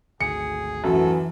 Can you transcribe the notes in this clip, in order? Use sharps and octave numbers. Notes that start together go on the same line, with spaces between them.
G#1 D2 G#4 C#7
F#2 E3 A3 B3 A4